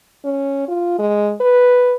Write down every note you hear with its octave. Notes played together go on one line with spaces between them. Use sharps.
C#4
F4
G#3
B4